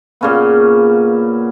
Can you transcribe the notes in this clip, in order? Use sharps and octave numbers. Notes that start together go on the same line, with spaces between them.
A#2 C#3 B3